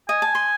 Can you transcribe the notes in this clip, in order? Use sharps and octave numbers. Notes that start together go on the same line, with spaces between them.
D#5 G#5
A5
C6